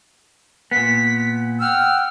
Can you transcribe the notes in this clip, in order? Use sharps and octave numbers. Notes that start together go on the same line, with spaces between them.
A#2 B3 B6
F#5 G5 E6 F6